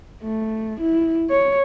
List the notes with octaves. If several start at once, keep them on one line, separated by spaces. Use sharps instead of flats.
A3
E4
C#5